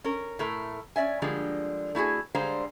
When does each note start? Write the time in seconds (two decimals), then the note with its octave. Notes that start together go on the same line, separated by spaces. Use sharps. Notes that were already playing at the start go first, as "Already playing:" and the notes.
0.04 C#4 A#4
0.39 A2 A3 A#4
0.96 C#4 D5 E5 G#5
1.22 D3 F3 G3 G#3 A#3
1.95 A3 E4 F#4 G#4
2.35 D3 G3 G#3 C5 F5 A#5